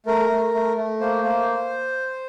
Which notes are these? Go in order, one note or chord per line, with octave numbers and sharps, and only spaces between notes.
A3 A#4
A3
A3
A3
A#3 C5
A#3